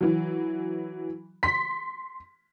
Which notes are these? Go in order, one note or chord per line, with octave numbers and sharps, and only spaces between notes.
E3 F#3
C6 B6